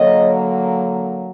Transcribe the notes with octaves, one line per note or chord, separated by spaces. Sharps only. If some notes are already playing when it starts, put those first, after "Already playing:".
Already playing: D3 F#3 A#3 C#5 D#5